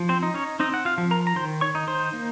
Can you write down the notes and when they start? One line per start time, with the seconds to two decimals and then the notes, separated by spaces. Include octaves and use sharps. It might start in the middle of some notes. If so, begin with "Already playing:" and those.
Already playing: F3
0.09 C4 C5
0.23 D#4
0.34 C#4 C#5
0.60 C4 D#4 D#5
0.74 F#5
0.85 F4 F5
0.98 F3
1.11 A#4 A#5
1.27 A#5
1.36 D#3 C5 C6
1.61 C#5 C#6
1.75 D#4
1.88 C5 C6
2.13 A#3